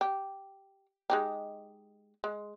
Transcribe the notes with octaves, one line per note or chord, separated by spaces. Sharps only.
G4
G#3 D#4 G4
G#3